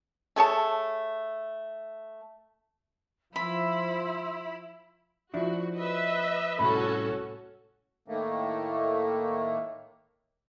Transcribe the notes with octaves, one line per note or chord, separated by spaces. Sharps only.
A3 G#4 C#5 A5
F3 E4 B5 C6 E6
F3 D4 E4 F#4
B4 D#5 E5
C2 A2 C#4 F#4 A4 B5
A2 D#3 A3 A#3